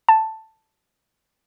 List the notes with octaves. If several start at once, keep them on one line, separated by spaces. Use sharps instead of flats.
A5